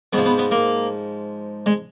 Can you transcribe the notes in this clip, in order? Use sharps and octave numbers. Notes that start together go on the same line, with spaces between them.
G#2 F3 B3
B3
B3
A#3
G#3